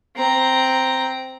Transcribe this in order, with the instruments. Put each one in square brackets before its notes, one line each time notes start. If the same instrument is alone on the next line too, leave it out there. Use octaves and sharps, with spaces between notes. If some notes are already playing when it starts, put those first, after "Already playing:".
[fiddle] C4 A#5